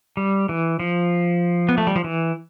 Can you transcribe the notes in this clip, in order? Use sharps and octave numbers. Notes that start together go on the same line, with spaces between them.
G3
E3
F3
B3
A3
G3
F3
E3